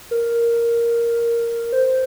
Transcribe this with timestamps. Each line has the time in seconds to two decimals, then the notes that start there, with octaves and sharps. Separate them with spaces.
0.11 A#4
1.73 C5